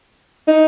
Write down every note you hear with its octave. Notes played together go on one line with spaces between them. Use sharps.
D#4